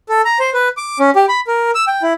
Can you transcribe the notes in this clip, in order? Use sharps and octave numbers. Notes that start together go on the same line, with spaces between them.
A4
A#5
C5
B4
D6
C#4
G4
B5
A#4
E6
G5
E4